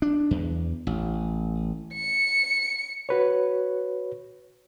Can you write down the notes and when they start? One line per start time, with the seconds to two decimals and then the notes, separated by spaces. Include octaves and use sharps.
0.02 D4
0.31 E2
0.87 A1
1.94 C#7
3.09 F#4 B4 C#5